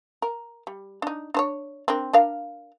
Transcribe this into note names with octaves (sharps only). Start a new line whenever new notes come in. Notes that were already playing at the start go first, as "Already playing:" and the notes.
A#4
G3
D4 D#4
D4 C5 C#5
C4 D4 A#4
D4 A#4 F5